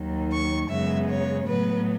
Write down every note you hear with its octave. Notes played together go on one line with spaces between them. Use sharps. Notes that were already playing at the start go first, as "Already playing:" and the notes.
Already playing: D#2 D#3 F#3
C#6
F#2 C#3 G#3 B3 E5
C#5
A2 F#3 B3 B4